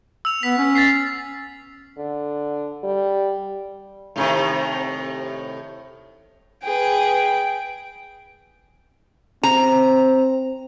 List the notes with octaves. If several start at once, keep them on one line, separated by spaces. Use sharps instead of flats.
E6 F7
B3 B6
C#4
A6 B6 C7
D3
G3
A2 C3 D#3
G#4 B4 G5
C4 A#5